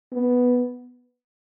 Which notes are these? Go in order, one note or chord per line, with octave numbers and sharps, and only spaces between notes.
B3